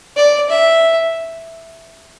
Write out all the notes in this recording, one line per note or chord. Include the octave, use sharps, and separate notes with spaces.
D5
E5